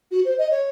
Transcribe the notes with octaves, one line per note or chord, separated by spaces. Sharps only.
F#4
C5
D#5
C#5